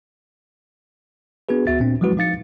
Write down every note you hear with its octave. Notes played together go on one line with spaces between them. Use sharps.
B3 D4 F#4 G#4 B4
D2 B3 F#4 E5 A6
A#2 C4 D4
F3 F#3 G#3 E4 F#4 B4
F3 D#4 F5 A6 C#7